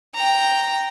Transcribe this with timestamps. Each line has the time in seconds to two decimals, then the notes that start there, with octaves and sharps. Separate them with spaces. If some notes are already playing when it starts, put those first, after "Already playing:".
0.14 G5 A#5